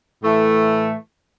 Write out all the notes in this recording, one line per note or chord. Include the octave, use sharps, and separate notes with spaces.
A2 E3 A3